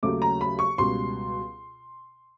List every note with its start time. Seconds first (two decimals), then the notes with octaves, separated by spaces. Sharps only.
0.03 D#2 C#3 F#3 A3 D6
0.22 A#5
0.41 B5
0.59 C#6
0.78 C#2 B2 G3 C6